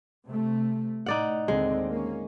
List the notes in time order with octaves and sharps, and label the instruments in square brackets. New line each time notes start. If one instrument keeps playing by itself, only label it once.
[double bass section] C3 A3
[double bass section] A2 [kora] D#4 D5 F#5
[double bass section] D#2 D3 C4 [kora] G#3
[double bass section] A#3 C#4